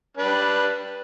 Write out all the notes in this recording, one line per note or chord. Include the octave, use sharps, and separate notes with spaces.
G3 D4 B4